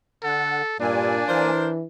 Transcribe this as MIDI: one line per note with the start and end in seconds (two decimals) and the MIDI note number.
0.24 0.62 50
0.24 0.77 69
0.24 0.62 78
0.80 1.15 43
0.80 1.24 46
0.80 1.50 58
0.80 1.85 62
0.80 1.50 74
0.80 1.50 80
1.29 1.85 52
1.29 1.68 70
1.29 1.68 72